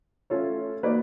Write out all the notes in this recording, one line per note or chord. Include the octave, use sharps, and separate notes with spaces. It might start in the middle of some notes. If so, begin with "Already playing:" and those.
A3 C#4 F4 A4 C#5
A#3 D#4 F#4 B4 D5